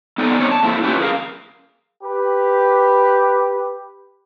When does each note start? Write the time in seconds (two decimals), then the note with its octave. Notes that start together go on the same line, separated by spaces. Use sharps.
0.18 B3 D#4 A4 C5 D5 G#5
0.40 C4 D#4 C#5 D5
0.51 A5
0.63 A3 A#3 C4 E4
0.83 C#4 D4 F4 G4 B4
1.00 G#4 A#4 F5
2.03 G4 B4